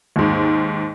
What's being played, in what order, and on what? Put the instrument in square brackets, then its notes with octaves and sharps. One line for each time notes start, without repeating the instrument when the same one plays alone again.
[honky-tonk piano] D#2 G#2